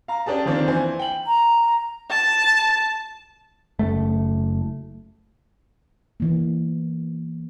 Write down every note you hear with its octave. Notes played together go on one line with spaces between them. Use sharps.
F5 A#5
C#4 D4 G4 G#4 A5
D3 D#3 F3 A#3 C4 D4
E3 C5 G#5
G5 F#7
A#5
A5
F#1 A3
E3 A#3